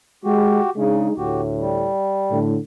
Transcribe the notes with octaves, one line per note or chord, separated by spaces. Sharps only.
G#3 F#4 G4
C#3 G#3 D4 D#4
D2 A2 F#4 G4
G3
A2 D3